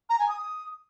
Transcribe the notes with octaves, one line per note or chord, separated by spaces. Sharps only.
A#5
G#5
D#6